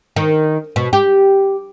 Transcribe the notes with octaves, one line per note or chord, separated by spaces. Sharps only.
D#3
B2
G4